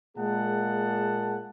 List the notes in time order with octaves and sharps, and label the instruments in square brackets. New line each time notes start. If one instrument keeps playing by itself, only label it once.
[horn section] A#2 G#3 A#3 G#4 F#5 A5